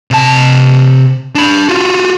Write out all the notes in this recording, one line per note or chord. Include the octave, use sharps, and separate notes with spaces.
C3 A5
D4 B5
F4 F#4